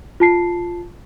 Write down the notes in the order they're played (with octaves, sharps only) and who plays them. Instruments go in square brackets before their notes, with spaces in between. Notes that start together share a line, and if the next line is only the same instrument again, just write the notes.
[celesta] F4 A5 C7